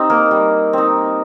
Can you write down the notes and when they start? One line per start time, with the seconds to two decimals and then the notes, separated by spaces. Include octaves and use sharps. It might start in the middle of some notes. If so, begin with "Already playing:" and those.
Already playing: C4 D#4 G4
0.10 A#3 A#4
0.31 G3
0.73 C4 D#4